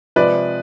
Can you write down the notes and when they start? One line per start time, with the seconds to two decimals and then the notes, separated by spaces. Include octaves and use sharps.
0.16 C3 F3 G#3 B4 D5